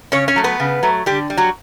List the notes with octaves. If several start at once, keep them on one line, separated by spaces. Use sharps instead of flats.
C#3 C#4 C#5
C#4 C#5
F#3 A3
B3 B4
C#3
F#3 A3
D3 G3 G4
G3
F#3 F#4